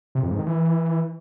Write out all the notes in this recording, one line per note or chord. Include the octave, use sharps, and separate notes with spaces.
C3
F2
G#2
D#3
E3